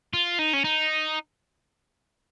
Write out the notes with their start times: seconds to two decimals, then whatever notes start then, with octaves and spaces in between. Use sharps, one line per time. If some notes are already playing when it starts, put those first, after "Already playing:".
0.14 F4
0.39 D#4
0.53 C#4
0.64 D#4